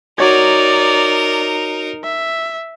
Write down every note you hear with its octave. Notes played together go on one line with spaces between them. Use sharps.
D#4 F#4 A#4 C#5 D5 G#6
E5